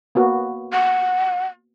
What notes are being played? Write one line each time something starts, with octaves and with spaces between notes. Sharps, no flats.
A#3 B3 F#4
F#5